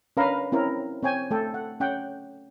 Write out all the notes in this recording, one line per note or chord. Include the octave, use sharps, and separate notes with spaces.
C#4 D4 A#4 B4 F5 A#5
C4 C#4 E4 A#4
C4 C#5 G5 G#5
A3 A4 G5
F#5
C#4 F#5 G5